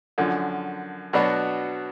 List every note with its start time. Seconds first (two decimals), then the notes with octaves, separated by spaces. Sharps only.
0.18 F#2 D3 F3
1.13 B2 F#3 B3 D4 F#4